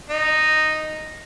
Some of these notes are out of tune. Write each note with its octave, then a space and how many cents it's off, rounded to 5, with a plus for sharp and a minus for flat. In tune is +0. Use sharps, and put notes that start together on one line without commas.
D#4 -5